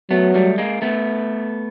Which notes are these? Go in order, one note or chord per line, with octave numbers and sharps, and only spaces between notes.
F#3 A3 B3
G3 A3
G#3 A#3
A3 B3